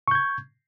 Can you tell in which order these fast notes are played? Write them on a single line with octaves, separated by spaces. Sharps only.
C#6 G6 G#6